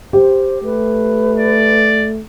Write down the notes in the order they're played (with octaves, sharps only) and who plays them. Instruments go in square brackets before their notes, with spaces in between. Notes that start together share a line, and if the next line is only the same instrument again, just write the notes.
[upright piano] G4 [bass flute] C5
[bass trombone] A3 [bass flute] B4
[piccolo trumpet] D5